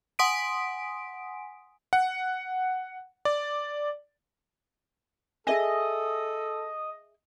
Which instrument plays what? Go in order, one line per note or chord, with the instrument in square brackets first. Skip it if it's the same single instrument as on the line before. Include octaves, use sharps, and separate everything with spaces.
[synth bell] F#5 G#5 C6 D#6 B6 D7
[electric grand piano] F#5
D5
[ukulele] G#4 E5 G#5 [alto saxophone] A4 [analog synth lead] D#5